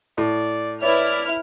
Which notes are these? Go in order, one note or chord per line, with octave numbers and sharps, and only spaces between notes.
A2 D5
E4 B4 C#5 D5 F6